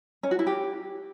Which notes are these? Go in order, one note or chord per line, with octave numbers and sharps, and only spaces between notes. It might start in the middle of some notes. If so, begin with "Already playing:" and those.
C#4
F#4
E4
G4